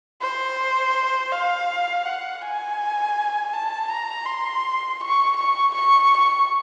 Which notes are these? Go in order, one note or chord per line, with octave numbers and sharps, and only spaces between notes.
C5
F5
F#5
G#5
A5
A#5
C6
C#6
C#6
C#6